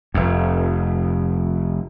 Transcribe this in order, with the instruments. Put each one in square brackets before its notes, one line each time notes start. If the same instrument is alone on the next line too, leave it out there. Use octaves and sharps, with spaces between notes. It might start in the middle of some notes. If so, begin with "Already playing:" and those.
[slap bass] F1 F2